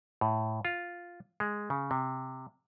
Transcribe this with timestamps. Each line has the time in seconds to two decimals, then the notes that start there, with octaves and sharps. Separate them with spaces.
0.21 A2
0.65 F4
1.40 G#3
1.70 C#3
1.91 C3